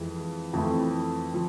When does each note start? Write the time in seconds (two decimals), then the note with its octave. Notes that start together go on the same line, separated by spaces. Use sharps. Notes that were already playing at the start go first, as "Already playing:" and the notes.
Already playing: F2 E3 G#3
0.53 F2 E3 A3 C4 E4
1.34 F3